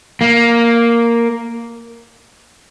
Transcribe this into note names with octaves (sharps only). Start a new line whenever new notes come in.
A#3